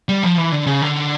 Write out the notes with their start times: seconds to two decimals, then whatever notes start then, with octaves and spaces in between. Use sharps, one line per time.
0.09 G3
0.23 F3
0.37 E3
0.52 D3
0.66 C#3
0.82 D3